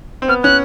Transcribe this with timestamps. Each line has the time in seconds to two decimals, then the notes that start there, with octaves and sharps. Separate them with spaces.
0.22 C4
0.28 B3 F6
0.43 C#4 F#6